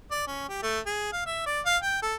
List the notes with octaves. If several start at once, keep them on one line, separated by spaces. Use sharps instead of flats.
D5
C#4
G4
A3
G#4
F5
E5
D5
F5
G5
A4